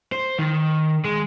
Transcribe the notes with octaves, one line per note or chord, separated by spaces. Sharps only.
C5
D#3
G#3